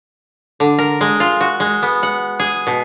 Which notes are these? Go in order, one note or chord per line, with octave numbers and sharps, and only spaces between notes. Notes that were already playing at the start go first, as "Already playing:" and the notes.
D3
A#4
G#3
F4
F#4
G#3
B3
F#5
G#4
B2